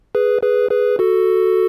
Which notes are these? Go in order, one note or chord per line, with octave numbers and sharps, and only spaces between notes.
G#4 B4
G#4 B4
G#4 B4
F#4 A4